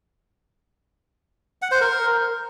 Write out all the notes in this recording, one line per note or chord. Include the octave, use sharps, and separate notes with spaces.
F#5
C5
A#4